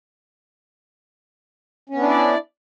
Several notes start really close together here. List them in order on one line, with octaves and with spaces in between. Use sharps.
C#4 B3 D4 E4 D5